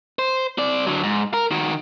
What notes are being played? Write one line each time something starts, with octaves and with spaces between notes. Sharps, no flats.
C5
C4 D5
D3 F#3
G#2
A#4
D#3 F#4